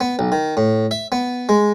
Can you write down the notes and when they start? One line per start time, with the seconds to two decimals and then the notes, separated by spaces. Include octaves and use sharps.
0.01 B3
0.19 B1
0.32 D#3
0.57 A2
0.91 E5
1.12 B3
1.49 G#3